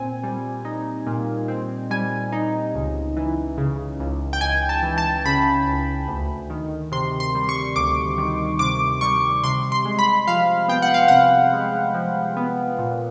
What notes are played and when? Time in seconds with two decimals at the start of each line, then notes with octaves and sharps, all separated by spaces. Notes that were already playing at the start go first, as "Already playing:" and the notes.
Already playing: A#2 C4 G#5
0.24 G3
0.65 D#4
1.07 A#2
1.48 C4
1.91 G3 G#5
2.32 D#4
2.75 C#2
3.16 E3
3.58 C#3
4.00 C#2
4.33 G5
4.41 C#2 G#5
4.69 A5
4.83 E3
4.98 A5
5.25 C#3 B5
5.67 C#2
6.08 D2
6.50 D#3
6.92 C3 C6
7.20 C6
7.35 G3
7.49 C#6
7.76 D2 D6
8.18 D#3
8.59 C3 D6
9.01 G3 C#6
9.44 C3 C6
9.72 C6
9.85 G#3
9.99 B5
10.27 F3 F5
10.68 B3 G5
10.82 F#5
10.94 F5
11.08 C3 F#5
11.53 G#3
11.94 F3
12.37 B3
12.79 A#2